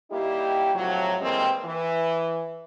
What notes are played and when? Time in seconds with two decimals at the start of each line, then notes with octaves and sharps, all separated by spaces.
0.11 G3 A#3 D#4 E4 G4
0.75 A2 C3 F3 F#3
1.20 E3 G3 G#3 A#3 C4
1.65 E3